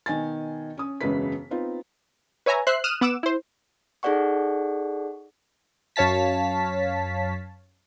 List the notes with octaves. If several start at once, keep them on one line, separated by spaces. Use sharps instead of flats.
B2 D#3 G#5 A6
C#4 D#6
E1 F#2 C#3 G#3 B4 B6
B3 C4 D#4 F4
B4 C#5 E5 G#5 A#5
C5 E5 F#6 C7
D#6 F6 F#6 D#7 E7
B3 F#5 D6 E6 E7
E4 C5
D#4 G#4 A4 D5 F#5 C#6
F#2 C#5 F5 A5 B6